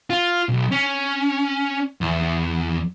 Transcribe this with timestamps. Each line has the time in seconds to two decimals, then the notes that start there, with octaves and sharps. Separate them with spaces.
0.10 F4
0.49 B1
0.72 C#4
2.01 E2